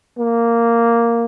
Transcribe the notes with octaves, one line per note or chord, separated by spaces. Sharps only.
A#3